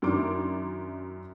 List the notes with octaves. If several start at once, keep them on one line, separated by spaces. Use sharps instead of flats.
F#2 D#3 D4 E4 C6 D6